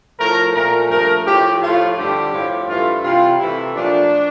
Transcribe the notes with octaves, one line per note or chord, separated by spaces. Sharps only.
A2 F3 A3 A#4
A#2 A3 A#4
G2 F3 A3 A#4
A2 F3 A3 G4
A2 F3 A3 F4
G2 D3 G3 G4
A2 F3 A3
G2 E3 A3 F4
C3 E3 G3 F4
C3 E3 A3 E4
A#2 F3 A3 D4